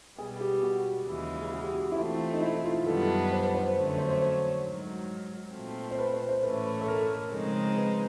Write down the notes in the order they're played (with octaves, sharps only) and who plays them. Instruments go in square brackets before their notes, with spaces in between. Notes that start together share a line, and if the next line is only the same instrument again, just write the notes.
[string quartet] B2 G3 B3 [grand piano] G#4
[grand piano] G4
F#4
[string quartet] D#2 C#3 E3 G#3
[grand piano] F#4
G4
F#4
E4
[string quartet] E3 A3 C4 [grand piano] F4
[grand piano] D#4
E4
F4
[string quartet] F#2 D#3 G3 B3 D4 [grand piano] A4
[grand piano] C5
B4
C5
B4
[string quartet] F2 D3 F#3 A3 C#4 [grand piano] C5
[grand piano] C5
C5
C5
C#5
[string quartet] G#2 D#3 F#3
A#2 F3 A3 C4
[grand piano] C5
B4
C5
C5
[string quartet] A2 E3 A3 C#4 [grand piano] B4
[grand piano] A4
A#4
[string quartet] C#3 F3 G#3 C4 D#4
[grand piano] B4